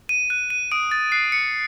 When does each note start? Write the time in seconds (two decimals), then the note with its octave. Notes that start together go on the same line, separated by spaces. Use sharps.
0.09 D#7
0.30 F#6 D#7
0.50 D#7
0.72 D#6 D7
0.91 A6
1.12 F#6 C7
1.32 C#7